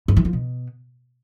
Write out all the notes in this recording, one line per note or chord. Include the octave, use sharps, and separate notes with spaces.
G2
E3
F3
B2